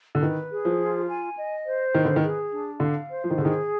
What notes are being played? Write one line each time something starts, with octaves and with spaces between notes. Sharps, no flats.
D3
D#3 B4
G#4
F3
F4
G#5
D#5
C5
D#3 B4
D3
D#3
G#4
D4
D3 F5
C5
F3
D#3
D3 G#4
D#3